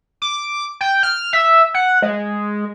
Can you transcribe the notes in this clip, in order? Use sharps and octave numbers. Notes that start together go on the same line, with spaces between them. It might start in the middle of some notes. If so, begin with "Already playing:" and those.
D6
G5
F6
E5
F#5
G#3